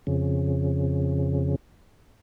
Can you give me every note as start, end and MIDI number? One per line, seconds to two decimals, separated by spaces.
0.07 1.56 41
0.07 1.56 49